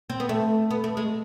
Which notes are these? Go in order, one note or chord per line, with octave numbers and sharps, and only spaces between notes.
C4
B3
A3
B3
A3
G#3